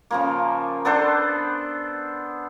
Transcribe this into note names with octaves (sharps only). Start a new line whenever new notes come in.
C#3 F3 A#3
B3 D4 A4 C5